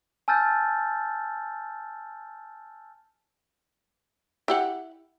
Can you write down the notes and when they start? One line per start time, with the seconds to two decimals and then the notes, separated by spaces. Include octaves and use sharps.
0.28 G#5 A5 E6 F6 G6 A6
4.48 E4 G4 F#5